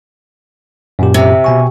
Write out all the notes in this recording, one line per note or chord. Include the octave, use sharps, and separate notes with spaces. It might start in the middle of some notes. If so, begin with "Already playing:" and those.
F#2 A#2 G4
C3
B2 G#5 C#6